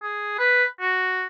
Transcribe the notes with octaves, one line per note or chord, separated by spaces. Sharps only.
G#4
B4
F#4